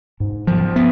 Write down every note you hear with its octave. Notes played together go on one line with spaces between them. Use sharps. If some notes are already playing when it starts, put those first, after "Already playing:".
G#2
F3
B3